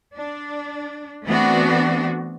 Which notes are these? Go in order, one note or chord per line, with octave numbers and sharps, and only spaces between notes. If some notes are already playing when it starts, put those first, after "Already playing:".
D4
E3 A3 B3 C4 D4 F#4